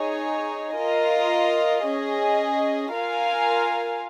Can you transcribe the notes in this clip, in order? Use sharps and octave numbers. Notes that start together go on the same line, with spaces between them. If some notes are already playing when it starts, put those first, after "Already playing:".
Already playing: D#4 G#4 C#5 G#5
F4 A#4 D#5
C#4 G#4 D#5
F4 A#4 F5 G#5